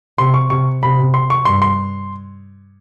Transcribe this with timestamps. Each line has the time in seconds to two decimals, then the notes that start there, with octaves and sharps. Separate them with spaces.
0.18 C3 C6
0.34 C#6
0.50 C3 C#6
0.82 C3 B5
1.14 C6
1.30 C#6
1.45 G2 C6
1.62 C6